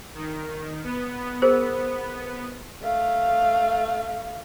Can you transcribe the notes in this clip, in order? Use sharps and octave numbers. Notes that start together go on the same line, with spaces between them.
D#3
B3
G#4 A#4 C5
A3 F5